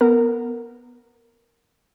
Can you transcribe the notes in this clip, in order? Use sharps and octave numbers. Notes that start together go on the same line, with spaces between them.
B3 A#4